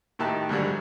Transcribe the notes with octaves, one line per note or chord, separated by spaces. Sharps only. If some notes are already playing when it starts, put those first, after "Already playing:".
A2 D#3 D#4 G4 A5 F#6
G#2 D3 F#3 G3